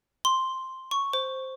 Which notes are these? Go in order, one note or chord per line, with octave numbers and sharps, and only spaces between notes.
C6
C#6
C5